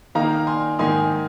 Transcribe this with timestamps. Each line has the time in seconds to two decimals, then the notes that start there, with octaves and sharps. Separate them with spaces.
0.15 D#3 A#3 D#4 F5 A#5
0.47 G#5 C6
0.79 G#2 D#3 A#3 D#4 G#5 C6